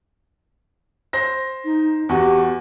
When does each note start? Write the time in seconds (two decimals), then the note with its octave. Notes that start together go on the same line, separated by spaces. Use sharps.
1.13 C5 A#6
1.65 D#4
2.09 E2 F#4 G4